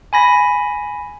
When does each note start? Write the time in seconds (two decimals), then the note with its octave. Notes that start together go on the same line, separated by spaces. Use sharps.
0.13 G#5 B5 A#6